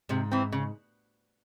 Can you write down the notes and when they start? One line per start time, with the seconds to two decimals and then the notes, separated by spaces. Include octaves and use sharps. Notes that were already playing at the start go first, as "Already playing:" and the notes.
0.09 G#2 C3
0.31 E3 C4
0.52 C#3